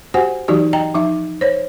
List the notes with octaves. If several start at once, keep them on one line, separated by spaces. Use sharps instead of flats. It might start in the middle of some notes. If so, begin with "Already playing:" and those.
F#4 G4 C5 F#5 G#5
E3 F#3 D#4 F#4 G4 D5
D#5 G5 A#5
F3 D#4 E5
C5 C#5